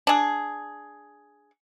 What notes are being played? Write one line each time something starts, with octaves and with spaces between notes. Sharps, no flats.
D4 G#4